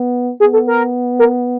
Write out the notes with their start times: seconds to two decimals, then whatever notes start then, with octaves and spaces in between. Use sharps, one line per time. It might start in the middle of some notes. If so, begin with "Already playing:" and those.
Already playing: B3
0.40 B3 G#4
0.53 A4
0.67 A#4
1.19 A#4